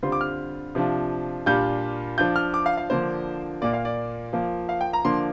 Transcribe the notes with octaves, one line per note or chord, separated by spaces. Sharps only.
D3 G3 C4 F4 C6
D6
F6
C3 F3 D4 F4
A#2 G3 D4 F4 G6
F3 D4 F4 G6
F6
D6
F5
F5
D3 F3 A#3 D4 C5
A#2 A#3 F4 D5
F5
D5
F3 A#3 F4
F5
G5
A#5
D3 F3 A#3 D4 C6